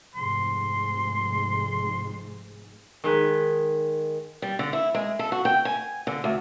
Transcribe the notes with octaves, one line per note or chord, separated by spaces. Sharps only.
F1 G#2 C6
D#3 G#3 B4
G3
D3
E4
G#3
A4
F#4
G5
G#5
D3
D2